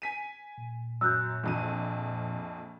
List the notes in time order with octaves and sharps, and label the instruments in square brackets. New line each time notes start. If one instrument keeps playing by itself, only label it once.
[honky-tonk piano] G#5 B6 D#7
[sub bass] A#2
[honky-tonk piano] F#2 F#3 [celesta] E6 F#6 G6
[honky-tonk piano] A#1 F2 D#7